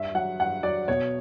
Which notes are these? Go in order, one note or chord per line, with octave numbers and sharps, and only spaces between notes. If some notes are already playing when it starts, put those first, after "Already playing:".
Already playing: G2 E5
F#3 F#5
G2 F#5
F#3 D5
B2 C#5